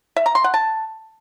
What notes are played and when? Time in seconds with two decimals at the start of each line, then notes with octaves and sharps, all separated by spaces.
0.16 E5
0.26 A#5
0.35 C6
0.44 F#5
0.54 A5